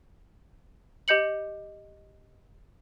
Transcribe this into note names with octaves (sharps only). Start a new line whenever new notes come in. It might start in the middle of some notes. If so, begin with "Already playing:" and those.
G4 D#5 G6 C#7 F#7